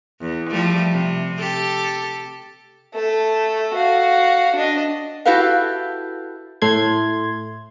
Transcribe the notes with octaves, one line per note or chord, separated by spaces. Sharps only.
E2
F3 G3 A3
C3
G4 A4
A3 A4
F#4 F5
D4 D#5
E4 F#4 G4 A4 B4 F5
A2 A3 C6 G#6